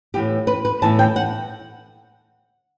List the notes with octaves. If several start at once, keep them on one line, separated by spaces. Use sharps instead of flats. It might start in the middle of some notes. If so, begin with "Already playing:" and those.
A2 E3 B3 G4
B4
B4
A2 E3 B3 A5
G5
F#5